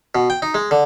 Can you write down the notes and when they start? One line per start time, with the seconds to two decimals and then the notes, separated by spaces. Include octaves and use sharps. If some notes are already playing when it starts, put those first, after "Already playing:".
0.15 B2
0.30 G5
0.42 D#4
0.55 G#3
0.71 D3